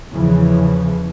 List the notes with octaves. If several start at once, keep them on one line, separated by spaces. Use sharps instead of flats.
E2 C#3 E3 F3